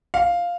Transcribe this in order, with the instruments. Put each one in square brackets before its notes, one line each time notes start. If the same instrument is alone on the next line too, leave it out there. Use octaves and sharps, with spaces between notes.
[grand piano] F5